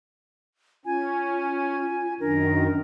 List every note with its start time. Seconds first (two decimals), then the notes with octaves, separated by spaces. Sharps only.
0.85 C#4 F4 G#5
2.20 F#2 D#3 D4 A#4